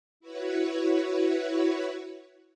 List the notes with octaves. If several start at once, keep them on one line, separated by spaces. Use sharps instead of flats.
E4 F#4 B4 C#5